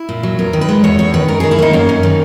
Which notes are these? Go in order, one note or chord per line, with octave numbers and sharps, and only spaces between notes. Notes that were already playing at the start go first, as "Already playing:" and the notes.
Already playing: E4
A#2
F#3
E2 A#4
D#3
B4
G#3
E2 C#5
E2 C#5
D#3 B4
F#2 A#4
D#3 G#4
E4
A#3 D#4
F#2 C#4
F#2
D#3